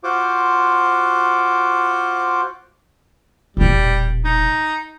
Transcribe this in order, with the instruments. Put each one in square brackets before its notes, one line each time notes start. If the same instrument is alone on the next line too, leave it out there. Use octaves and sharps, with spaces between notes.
[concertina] F4 F#4 C5 D6
[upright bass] E1 A#1 [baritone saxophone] G3
[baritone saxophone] D#4